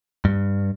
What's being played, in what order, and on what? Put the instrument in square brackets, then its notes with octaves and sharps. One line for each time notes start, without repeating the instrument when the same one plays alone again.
[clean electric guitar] G2